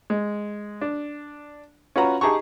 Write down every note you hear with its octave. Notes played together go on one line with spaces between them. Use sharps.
G#3
D4
C#4 F4 F#4 B4 F#5 A#5
D#4 G4 G#4 A5 A#5 C#6